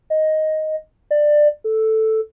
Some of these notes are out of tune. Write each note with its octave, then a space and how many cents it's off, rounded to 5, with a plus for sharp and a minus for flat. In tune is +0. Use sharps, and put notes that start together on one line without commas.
D#5 +5
D5 +15
A4 +0